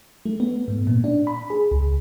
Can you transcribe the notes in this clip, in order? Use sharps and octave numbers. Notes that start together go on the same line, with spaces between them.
A3
B3
G#2
A#2
D4
B5
G#4
C#2